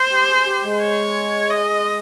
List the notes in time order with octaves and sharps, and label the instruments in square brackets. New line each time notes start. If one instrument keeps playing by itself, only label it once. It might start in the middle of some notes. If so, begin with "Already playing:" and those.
Already playing: [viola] C5
[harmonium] G4
G#4
G4
G#3
[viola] C#5
D#5